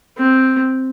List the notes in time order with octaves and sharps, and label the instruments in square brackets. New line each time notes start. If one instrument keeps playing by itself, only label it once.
[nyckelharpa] C4